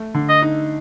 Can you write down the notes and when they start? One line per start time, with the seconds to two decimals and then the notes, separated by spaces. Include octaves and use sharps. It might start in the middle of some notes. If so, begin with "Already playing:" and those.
Already playing: A3
0.14 D3
0.29 D#5
0.42 D#4